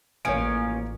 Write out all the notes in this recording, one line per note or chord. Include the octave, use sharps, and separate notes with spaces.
A1 F3 A#3 C#4 C#5 F5 D7